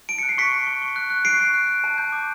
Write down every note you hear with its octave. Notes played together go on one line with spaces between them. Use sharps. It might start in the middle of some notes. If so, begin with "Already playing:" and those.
A5 D7
F#6 C#7
C7
C#6 B6 C#7
A5
C#6
C#6
F#6
F#6
C#6 C7 D7
C#6
F#6
F#6
A5
G6
D6